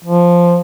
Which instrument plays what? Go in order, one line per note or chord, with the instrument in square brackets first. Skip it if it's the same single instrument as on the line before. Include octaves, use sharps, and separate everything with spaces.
[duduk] F3